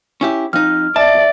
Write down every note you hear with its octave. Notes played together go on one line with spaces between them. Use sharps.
C#4 E4 G4
F2 D#4 F6
D5 E5 A5